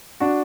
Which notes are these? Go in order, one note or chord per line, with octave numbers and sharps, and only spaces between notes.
D4 F#4